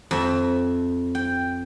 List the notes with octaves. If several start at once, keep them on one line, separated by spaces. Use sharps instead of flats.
F2 E5
G5